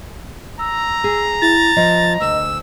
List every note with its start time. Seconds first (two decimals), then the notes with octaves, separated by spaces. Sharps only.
0.59 A#5 E6
1.04 G#4
1.42 E4 A6
1.77 F3 D#5
2.21 D2 E6